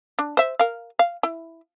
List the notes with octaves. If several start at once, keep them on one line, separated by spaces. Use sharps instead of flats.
D4
C5 E5
A#4 F5
F5
E4